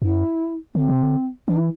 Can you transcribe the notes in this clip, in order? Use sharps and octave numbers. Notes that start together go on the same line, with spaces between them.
F#2 E4
D3 C4
C3
D3
E3 D4
E4